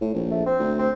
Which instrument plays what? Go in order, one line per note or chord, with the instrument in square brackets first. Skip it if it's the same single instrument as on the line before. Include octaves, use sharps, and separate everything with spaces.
[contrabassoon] A2
A#1
[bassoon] A3
C4
[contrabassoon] D2
[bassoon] C4